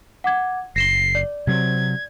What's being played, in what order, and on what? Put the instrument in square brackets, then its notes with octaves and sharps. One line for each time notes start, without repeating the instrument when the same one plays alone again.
[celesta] F#5 D6 G#6
[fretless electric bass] F#1 [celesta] A#6 E7 G7 [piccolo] C7
[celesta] D5
[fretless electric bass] C3 F#3 C4 [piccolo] G#6